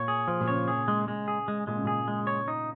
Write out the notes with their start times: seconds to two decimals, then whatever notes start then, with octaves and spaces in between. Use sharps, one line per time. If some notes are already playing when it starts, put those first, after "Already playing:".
Already playing: A#2 C#5
0.08 G#4
0.28 F3
0.40 A#2
0.48 C#3 C#5
0.68 G#4
0.88 G#3
1.08 G#3
1.28 G#4
1.48 G#3
1.67 A#2 G#3
1.76 C#3
1.84 A#2 G#4
2.08 G#3
2.27 C#5
2.48 D#4